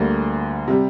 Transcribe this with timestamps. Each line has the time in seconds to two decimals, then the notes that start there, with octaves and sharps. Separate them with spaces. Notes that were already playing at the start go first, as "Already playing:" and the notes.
Already playing: D2 D3 G3 A#3
0.68 C3 G3